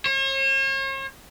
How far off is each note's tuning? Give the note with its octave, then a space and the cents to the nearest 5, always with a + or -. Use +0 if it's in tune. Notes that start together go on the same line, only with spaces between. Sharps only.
C#5 -45